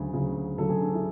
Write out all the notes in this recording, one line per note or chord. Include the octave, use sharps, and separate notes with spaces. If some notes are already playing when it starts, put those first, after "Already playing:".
Already playing: D2 C#3 F#3 G#4
D2 C#3 F#3
D2 C#3 F#3 A4
G#4
D4
E4